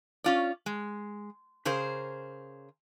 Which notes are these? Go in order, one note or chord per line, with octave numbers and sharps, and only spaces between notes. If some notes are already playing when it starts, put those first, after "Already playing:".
C#4 F4 D5
G#3
C#3 G#4 A#4 C5